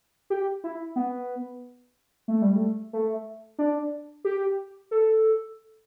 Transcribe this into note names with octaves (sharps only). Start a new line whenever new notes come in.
G4
E4
B3
A3
G3
A3
A3
D4
G4
A4